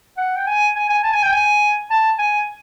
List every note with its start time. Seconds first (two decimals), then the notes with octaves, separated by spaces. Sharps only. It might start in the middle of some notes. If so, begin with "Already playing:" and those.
0.17 F#5
0.36 G5
0.46 G#5
0.75 G#5
0.89 G#5
1.03 A5
1.13 G#5
1.23 G5
1.32 G#5
1.90 A5
2.18 G#5